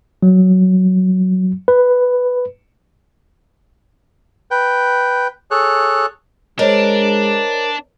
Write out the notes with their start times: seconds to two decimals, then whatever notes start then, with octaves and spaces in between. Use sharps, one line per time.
0.23 F#3
1.68 B4
4.51 B4 G5
5.51 G#4 A4 C#5 F#6
6.59 G#3 D4 A#4 C5 C#5 D#5